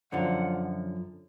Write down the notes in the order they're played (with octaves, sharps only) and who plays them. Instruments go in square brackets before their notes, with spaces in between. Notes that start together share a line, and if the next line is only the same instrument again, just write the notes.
[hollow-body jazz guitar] F#2 D3 F3 [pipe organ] F#5